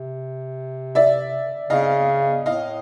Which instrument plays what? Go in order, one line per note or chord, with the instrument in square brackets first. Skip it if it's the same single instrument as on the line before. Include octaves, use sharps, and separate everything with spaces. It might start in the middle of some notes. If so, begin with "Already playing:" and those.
Already playing: [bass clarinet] C3
[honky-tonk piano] D5 E5
[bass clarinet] C#3 [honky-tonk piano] D#5 F5
[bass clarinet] A2 [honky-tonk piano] D#5 F5